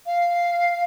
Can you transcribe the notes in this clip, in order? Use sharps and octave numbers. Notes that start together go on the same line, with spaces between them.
F5